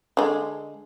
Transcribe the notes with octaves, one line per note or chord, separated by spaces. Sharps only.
D3 G#3